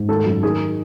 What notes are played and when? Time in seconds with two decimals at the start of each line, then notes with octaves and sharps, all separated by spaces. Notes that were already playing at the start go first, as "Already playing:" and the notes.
Already playing: G#2
0.08 D#3 A4
0.25 F#2
0.43 D#3 G#4